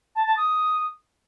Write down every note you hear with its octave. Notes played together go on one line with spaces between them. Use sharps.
A5
A5
D#6